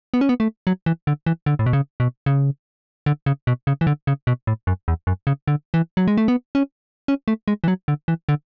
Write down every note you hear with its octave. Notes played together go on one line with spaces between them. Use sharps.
B3
C#4
B3
A3
F#3
E3
D3
E3
D3
A2
B2
C#3
B2
C#3
D3
C#3
B2
C#3
E3
D3
C#3
B2
A2
F#2
E2
F#2
C#3
D3
E3
F#3
G#3
A3
B3
C#4
C#4
A3
G#3
E3
F#3
D3
E3
D3